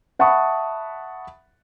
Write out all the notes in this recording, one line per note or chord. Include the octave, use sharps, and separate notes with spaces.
E5 F#5 A5 B5 C#6 D#6